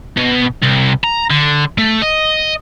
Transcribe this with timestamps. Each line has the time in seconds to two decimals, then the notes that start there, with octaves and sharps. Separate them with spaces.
0.17 B2
0.63 C2
1.04 A#5
1.30 D3
1.78 A3
2.02 D#5